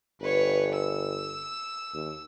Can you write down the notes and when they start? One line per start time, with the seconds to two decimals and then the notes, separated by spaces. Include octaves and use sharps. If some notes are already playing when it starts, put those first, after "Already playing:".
0.21 G1 B4 C#5
0.75 E6
1.94 D#2